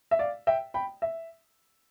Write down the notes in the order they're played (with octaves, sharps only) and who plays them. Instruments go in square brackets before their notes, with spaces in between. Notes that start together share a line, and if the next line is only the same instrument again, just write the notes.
[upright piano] E5
D5 F5
E5 G5
G5 B5
E5